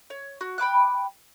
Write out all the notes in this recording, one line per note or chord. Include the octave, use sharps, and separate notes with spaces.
C#5
F#4
G5 B5 D6 F#6